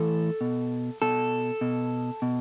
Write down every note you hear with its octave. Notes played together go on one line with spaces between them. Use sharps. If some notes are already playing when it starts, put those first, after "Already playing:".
Already playing: A2 E3 A4
B2
B2 A4
B2
B2